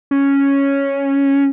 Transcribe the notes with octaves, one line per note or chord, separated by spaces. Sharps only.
C#4